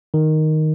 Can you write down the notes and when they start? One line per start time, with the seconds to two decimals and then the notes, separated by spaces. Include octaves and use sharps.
0.14 D#3